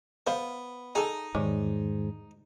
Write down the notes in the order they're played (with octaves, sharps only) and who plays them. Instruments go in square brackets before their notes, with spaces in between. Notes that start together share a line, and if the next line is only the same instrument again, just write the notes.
[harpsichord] B3 [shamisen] C5 F5
[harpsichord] D#4 [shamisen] G#4 A4
[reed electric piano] E2 D#3 [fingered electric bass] G#2 [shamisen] G3 G#3 C#5